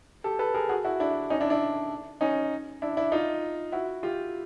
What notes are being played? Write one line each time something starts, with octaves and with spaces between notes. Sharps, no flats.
G4 A4
A4 B4
G#4 A#4
F#4 G#4
E4 F#4
D4 E4
C#4 D#4
D4 E4
D4 E4
C#4 D#4
D4 E4
D4 E4
D#4 F4
E4 F#4
F4 G4